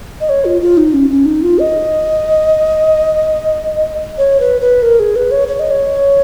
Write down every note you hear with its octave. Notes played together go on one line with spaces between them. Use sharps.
D#5
C#5
F4
F4
D#4
C#4
C#4
D#4
F4
D#5
C#5
B4
B4
A#4
G#4
B4
C#5
C#5
D#5
C#5